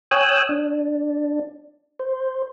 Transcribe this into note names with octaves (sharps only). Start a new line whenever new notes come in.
C#5 G5 G#5 D#6 E6 F#6
D4
C5